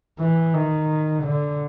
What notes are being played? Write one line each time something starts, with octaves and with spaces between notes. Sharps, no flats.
E3
D#3
D3